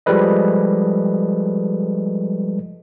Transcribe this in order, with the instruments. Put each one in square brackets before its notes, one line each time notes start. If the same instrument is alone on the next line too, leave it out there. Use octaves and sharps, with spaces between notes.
[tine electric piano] F3 G3 G#3 A4 B4 D#5